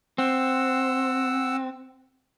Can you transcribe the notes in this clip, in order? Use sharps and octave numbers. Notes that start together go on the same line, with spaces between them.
C4 F#5 E6